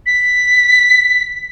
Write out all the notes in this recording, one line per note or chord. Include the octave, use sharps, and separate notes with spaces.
B6